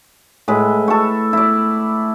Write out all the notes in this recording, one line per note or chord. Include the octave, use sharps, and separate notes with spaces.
A2 G#3 B4
A4 C#6
E4 D5